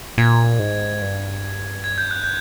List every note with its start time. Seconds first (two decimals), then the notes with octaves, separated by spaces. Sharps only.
0.18 A#2 G#6
0.59 G#2
1.02 G2
1.84 G#6
1.98 G6
2.11 F#6
2.24 G6